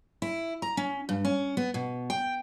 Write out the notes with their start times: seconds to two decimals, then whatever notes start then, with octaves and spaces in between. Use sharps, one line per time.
0.22 E4
0.62 A#5
0.77 C#4
1.09 G2
1.25 C#4
1.57 B3
1.74 B2
2.10 G5